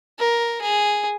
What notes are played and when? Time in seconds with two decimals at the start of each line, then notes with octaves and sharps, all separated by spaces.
0.19 A#4
0.61 G#4